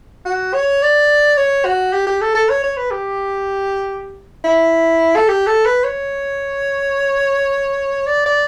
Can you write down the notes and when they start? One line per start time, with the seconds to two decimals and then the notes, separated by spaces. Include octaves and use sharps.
0.25 F#4
0.54 C#5
0.82 D5
1.37 C#5
1.65 F#4
1.93 G4
2.07 G4
2.21 A4
2.35 A4
2.49 C#5
2.64 C#5
2.77 B4
2.91 G4
4.44 E4
5.16 A4
5.28 G4
5.47 A4
5.65 B4
5.84 C#5
8.06 D5
8.26 D5